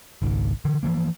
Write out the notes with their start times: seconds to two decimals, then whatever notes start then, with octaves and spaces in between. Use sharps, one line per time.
0.22 G#1 C#2 D#3
0.65 D3 E3
0.83 E3 F3 A#3